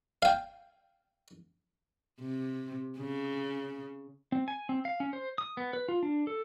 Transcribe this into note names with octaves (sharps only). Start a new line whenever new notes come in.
F5 G5
C3
C#3
C4
G#5
C4
F5
C#4
C5
D#6
B3
B4
F4
D4
A4